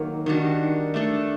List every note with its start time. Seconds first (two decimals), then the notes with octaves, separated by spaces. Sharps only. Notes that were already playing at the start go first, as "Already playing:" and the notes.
Already playing: D#3 F#3 A#3 F#4
0.26 D#3 G3 D4 F#4
0.94 A3 D4 A4